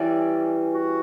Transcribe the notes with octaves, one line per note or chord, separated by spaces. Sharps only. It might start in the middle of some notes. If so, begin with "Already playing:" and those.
Already playing: E3 G3 C#4 D5
F#4